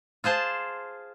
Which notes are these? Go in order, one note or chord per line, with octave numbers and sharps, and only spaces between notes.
F4 G#4 C5 A5